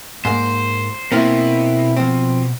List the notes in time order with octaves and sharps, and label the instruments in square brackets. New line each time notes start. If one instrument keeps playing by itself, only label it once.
[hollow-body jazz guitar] G#2 A#3 [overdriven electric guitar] C5
[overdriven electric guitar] B2 [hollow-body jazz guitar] A#3 C4 E4
[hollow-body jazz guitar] F3 C4